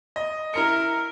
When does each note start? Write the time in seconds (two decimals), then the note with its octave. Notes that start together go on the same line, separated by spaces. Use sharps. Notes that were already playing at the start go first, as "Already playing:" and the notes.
0.16 D#5
0.54 E4 A#4 A#5 C#7